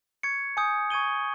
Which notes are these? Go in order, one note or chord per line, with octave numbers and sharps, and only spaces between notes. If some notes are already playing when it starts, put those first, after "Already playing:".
C#6 G#6 C#7
G#5 D#6 G6 C#7
C#6 G#6 D#7 G7